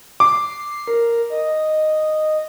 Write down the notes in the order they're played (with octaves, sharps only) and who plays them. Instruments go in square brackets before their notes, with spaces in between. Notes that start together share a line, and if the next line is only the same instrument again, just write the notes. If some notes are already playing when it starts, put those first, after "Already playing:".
[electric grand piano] D6 [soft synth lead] C7
[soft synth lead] A#4
D#5